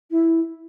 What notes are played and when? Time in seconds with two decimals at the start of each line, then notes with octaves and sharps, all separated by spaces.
0.11 E4